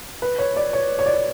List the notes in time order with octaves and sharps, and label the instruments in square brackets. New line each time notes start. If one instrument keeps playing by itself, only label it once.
[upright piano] B4
C#5
D5
C#5
C#5
D5
C#5